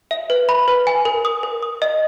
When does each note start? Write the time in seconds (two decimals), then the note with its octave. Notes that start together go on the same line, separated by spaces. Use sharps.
0.11 E5
0.30 B4
0.49 B5
0.68 B4
0.87 G#5
1.05 A#4
1.25 D#6
1.43 A#4
1.62 D#6
1.82 D#5